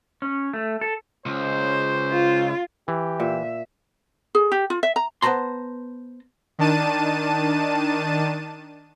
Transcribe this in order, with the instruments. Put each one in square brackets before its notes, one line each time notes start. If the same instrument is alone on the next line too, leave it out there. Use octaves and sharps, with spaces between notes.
[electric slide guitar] C#4
A3
A4
[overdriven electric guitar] C#2 [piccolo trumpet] C5
[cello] F4
[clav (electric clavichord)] E3 [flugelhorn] G4
[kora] A#2 [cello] E5
[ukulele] G#4
G4
F4
E5
A#5
[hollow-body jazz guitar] B3 B4 C5 A5 A#5 C6
[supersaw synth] D#3 D4 A5 D#7